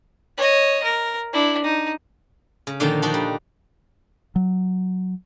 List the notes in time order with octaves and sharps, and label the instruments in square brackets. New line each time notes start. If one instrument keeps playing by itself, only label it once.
[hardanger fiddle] C#5 D#5
A#4
D4 E4
D#4
[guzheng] C#3
A#2 D3 D#3 F3 A#3 D#4
F3 D4 D#4 F#4
G3
[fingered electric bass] F#3